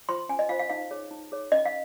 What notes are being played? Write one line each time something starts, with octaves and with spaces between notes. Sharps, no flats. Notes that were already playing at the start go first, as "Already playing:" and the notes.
F4 C5 C6
C#4 G#5
D#5
F4 C5 F5
F5
D#4 F5
G#4 C#5
D#4
G#4 C#5
C#4 D#5
F5